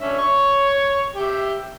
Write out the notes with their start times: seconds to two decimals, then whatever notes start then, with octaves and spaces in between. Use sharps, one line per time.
0.01 C#4 D4 E5
0.19 C#5 C#6
1.16 G4 E5